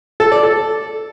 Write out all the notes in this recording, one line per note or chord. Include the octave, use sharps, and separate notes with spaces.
A4
D5
A4